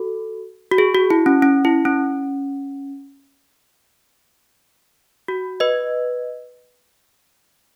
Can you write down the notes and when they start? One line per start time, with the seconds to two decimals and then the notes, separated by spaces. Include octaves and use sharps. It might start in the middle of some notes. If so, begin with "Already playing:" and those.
Already playing: F#4 A4
0.72 F#4
0.78 G#4
0.95 F#4
1.10 E4
1.26 C#4
1.42 C#4
1.65 E4
1.85 C#4
5.28 F#4
5.60 B4 D#5